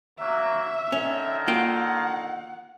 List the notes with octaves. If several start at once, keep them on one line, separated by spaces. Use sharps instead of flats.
F#3 A#3 E5
D3 D#3 C#4
A#3 F4 F#5 G5